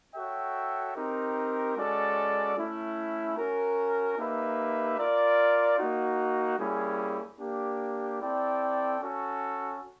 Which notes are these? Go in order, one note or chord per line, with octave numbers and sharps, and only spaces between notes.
F#4 A4 C#5 E5 G5
C4 D#4 G4 A#4
G#3 C#4 F#4 A4 D5
A3 C#4 E4
C#4 F#4 A#4
A#3 D#4 G4 B4 E5
F4 A#4 D5
A#3 D#4 F#4
G3 A#3 C#4 E4 G#4
A#3 D4 G4
C4 E4 A4 D5 G5
C#4 F#4 A4